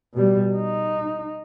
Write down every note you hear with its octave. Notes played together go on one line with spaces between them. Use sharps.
B2 G3
D#4